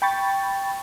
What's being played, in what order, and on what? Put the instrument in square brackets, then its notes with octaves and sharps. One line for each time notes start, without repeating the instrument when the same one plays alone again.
[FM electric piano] G5 B5 C#6 A6